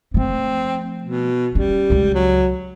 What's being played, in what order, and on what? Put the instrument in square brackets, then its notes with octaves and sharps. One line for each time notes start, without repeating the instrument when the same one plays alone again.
[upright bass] F3 A3 [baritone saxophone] C4
[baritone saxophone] B2
[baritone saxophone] G3 [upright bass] C#4
[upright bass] C#2 C#3
[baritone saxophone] F#3